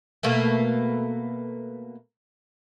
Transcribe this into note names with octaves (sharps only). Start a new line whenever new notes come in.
B2 A3 A#3